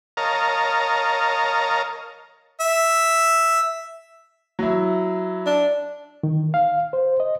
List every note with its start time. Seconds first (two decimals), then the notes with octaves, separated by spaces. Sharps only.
0.17 A#4 C#5 D#5 F5 A5 A#5
2.60 E5
4.59 F#3 E4
5.46 D4
6.23 D#3
6.54 F5
6.93 C5
7.20 D#5